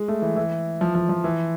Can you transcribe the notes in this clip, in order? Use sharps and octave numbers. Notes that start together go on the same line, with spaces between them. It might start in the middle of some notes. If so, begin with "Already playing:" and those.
Already playing: G#3
A3
E3
E3
F3
F3
F3
E3